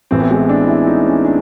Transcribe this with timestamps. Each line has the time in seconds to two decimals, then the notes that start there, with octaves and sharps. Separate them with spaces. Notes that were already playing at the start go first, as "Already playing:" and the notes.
0.11 A1 A2 E3 C4
0.20 B3
0.31 G#3
0.49 D4
0.67 E4
0.87 D#4
1.05 C#4
1.25 D4